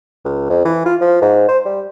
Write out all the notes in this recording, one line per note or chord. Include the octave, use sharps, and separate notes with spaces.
C#2
F2
E3
F4
F3
G#2
C5
G3